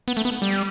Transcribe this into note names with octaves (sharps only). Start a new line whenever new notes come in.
B3
A3
B3
G3